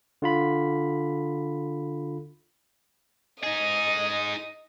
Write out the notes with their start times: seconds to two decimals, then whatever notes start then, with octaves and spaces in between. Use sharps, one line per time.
0.22 D3 F4 B5
3.43 D#4 G#4 D#5